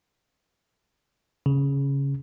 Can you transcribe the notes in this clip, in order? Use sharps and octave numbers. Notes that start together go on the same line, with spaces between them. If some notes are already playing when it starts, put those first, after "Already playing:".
C#3